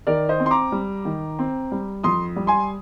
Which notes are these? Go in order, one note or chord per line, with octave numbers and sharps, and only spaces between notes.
D#3 A#4 D5
C5 D#5
C4
C6
A#5 D6
G3
D#3
C4
G3
F2 C6 D#6
G3
G#5 C6